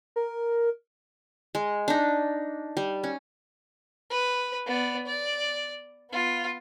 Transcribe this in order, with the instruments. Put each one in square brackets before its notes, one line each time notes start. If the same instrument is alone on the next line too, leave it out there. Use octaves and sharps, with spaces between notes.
[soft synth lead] A#4
[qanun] G#3
D4 D#4
G3
C#4
[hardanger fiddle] B4
B3 D5
D5
B3 F4